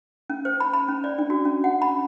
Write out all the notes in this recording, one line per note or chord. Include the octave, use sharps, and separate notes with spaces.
C#4
C5
B5
B5
C#4
D5
D4
F#4
C#4
F#5
B5